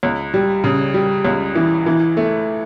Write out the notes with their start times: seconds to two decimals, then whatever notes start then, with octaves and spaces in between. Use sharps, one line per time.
0.03 C#2
0.34 G3
0.64 C#3
0.94 G3
1.25 C#2
1.55 E3
1.86 E3
2.17 A3